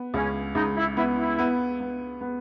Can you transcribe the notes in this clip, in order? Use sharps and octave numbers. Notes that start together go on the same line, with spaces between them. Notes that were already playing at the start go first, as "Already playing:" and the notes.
Already playing: B3
C#2 C#4
C#2 D#4
E4
B3 E4
E4
B3
B3
B3